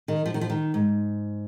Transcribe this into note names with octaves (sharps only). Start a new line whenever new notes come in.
D#3
F3
D#3
F3
D#3
G#2